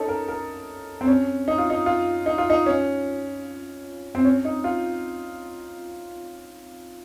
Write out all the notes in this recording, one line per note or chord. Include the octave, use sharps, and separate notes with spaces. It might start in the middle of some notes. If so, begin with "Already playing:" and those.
Already playing: C#4 D#4 A4
A#4
A#4
C4
C#4
D#4
F4
D#4
F4
D#4
F4
D#4
C#4
C4
C#4
D#4
F4